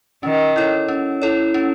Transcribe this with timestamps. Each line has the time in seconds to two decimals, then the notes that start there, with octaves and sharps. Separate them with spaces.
0.23 D#3 C#4
0.56 E4 A4 C#5
0.88 C#4
1.22 E4 A4 C#5
1.54 C#4